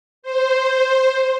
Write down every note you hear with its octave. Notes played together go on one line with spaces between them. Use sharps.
C5